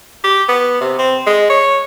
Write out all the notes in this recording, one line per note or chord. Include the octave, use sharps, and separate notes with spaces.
G4
B3
C3
C4
G#3
C#5